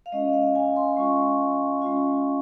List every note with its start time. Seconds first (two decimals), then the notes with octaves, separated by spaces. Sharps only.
0.06 F5
0.12 G#3 C#4 F4 D#5
0.33 F5
0.55 G#5
0.76 C6
0.97 G#3 C#4 F4 C#6
1.82 G#3 C#4 F4